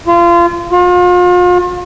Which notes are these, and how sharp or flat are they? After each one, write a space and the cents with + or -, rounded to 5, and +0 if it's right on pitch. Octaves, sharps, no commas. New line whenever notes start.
F4 -25
F4 +40